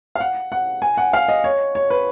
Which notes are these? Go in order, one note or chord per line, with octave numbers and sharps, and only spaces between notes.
F5
F#5
F#5
G#5
F#5
F5
D#5
C#5
C#5
B4